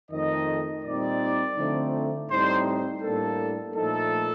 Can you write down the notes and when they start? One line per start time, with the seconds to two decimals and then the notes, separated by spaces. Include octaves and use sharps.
0.11 F2 D#3 A3 D#4 D#5
0.84 A#2 G3 C4 D#4 D5
1.57 D3 F3 A3 C4 D#4
2.30 A2 G3 C4 D#4 C5
3.02 A2 G3 A#3 D4 A4
3.75 A#2 F3 A3 D#4 A4